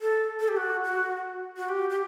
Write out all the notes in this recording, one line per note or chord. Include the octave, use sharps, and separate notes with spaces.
A4
A4
G4
F#4
F#4
F#4
G4
G4